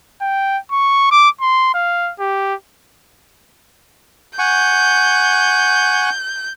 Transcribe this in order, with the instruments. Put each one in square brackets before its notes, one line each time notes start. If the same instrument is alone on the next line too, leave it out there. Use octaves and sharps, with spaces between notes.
[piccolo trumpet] G5
C#6
D6
C6
F5
G4
[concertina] F#5 G#5 C#6 [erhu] G6